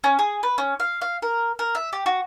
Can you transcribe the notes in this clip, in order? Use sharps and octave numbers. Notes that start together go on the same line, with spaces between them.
C#4
G#4
B4
C#4
F5
F5
A#4
A#4
E5
G4
F#4